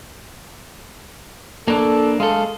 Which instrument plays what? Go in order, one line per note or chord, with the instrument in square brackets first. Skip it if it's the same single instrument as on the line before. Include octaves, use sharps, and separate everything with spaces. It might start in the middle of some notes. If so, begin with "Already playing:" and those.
[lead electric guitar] A#3 D4 [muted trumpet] A4
[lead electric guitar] G#3 A4 [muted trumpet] F5